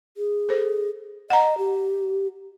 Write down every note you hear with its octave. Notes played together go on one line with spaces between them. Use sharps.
G#4
A4 C5
D#5 F#5 A#5
G4